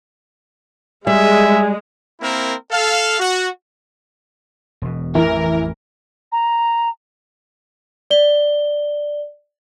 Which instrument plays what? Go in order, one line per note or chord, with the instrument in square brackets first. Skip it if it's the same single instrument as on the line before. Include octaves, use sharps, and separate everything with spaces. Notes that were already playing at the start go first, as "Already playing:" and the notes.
[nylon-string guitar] G3 [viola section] G#3 [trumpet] E5 [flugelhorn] G#5
[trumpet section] A#3 C4 E4 A#4
A4 F5
F#4
[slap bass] E1 B2
[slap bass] A1 F2 [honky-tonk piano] E3 [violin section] A#4
[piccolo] A#5
[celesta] D5 G7